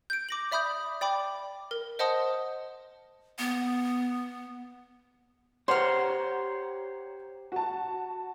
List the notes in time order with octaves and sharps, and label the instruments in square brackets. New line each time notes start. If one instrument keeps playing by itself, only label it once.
[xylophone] G6 D7
D6 A#6 F#7
D5 E5 B5 D#6 G6
D5 G5 B5 D6
A#4
C5 D#5 F#5 A5 C6 D#6
[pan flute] B3
[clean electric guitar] G4 C5 [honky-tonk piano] C#5 F#5 A#5 [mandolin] C6 F6
[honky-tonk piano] F#4 A5